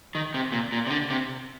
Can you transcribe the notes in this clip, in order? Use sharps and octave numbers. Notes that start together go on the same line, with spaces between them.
D#3
C3
A#2
A#2
C3
D3
C3